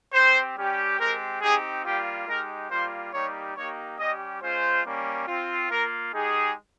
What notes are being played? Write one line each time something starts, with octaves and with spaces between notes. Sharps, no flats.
C4 G4 C5
G3 C#4 G4
G#3 C4 G4 A#4
C4 D#4 G4 G#4
G3 A#3 F4 G4
G#3 D#4 G4 A#4
G3 A#3 F4 C5
G3 A#3 D#4 G4 C#5
A#3 D#4 G4 C#5
G3 C#4 G4 D#5
G#3 C#4 F4 C5
G3 A#3 C#4
C4 F4
A#3 F4 A#4
G#3 D#4 G4 G#4